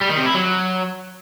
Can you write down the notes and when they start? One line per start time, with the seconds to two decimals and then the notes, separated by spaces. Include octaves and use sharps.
0.01 G3
0.10 D#3
0.18 C3
0.26 E4
0.35 F#3